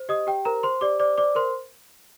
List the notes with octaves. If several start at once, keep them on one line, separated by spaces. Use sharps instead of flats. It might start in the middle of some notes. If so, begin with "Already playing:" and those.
Already playing: C5
G4 D#5 D#6
G4 G5
A#4 C5 A#5
C5 C6
G4 D5 D6
C5 D5 D6
C5 D5 D6
A#4 C5 C6